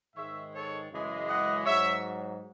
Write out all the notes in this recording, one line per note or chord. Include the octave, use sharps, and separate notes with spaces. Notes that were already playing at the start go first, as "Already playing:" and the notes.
G#2 D#3 G#3 C#5 E5
A4 C#5
F#2 C#3 E3 G#3
D#5 F#5
G#2 F#3 C#5 E5